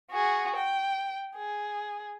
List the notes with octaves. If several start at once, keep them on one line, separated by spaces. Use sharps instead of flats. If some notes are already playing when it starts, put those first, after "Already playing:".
F#4 G#4
G5
G#4